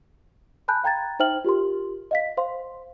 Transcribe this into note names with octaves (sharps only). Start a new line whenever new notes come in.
G#5 A5 B5 F#6 G6
F5 G5 A#5 G#6 A6
D#4 C5 E5 G5 F6 F#7
F4 G4 A#4 C6
D#5 F5 B6
C5 F5 C6